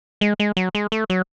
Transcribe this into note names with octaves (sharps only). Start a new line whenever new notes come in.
G#3
G#3
F#3
G#3
A3
F#3